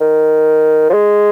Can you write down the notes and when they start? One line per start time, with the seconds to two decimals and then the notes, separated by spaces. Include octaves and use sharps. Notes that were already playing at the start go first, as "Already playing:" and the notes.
0.01 D#3
0.90 F3
0.93 G#3